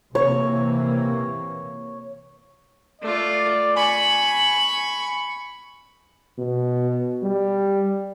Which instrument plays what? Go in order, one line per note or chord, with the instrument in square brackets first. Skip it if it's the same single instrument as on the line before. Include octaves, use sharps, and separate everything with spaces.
[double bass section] C3 E3 A#3 [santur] C#5
[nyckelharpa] A3 F4 [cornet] D5
[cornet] G#5 [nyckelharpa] B5 C#6
[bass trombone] B2
G3